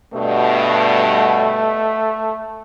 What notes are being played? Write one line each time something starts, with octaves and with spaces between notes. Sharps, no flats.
G2 B2 A3